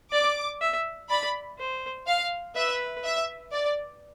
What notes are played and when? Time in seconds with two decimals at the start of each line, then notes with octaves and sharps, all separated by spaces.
0.12 D5 D6
0.61 E5
1.10 D5 B5
1.59 C5
2.07 F5
2.55 B4 E5
3.04 E5
3.53 D5